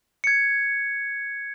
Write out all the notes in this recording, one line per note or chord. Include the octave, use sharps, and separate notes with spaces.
G#6 C#7